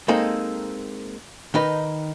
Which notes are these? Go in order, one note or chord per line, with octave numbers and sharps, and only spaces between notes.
G#3 A#3 C4 D#4 A4
D#3 D#4 B4